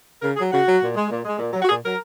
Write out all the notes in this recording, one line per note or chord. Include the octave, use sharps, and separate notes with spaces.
C#3 A#4
F#3 G#4
C#3 F#4
F#3
A#2
G#3
A#2
G#3
A#2
F#3
F#4
A#2 G#4
F#3 A#4